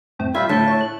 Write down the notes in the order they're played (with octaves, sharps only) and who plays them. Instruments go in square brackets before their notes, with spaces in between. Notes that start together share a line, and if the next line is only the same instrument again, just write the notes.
[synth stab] F2 A2 C4
[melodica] G3 E5 [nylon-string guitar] F4 [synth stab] G5 G#6
[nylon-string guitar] A2 [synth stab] D3 G6 [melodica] A5
[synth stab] A4 C#5
F#6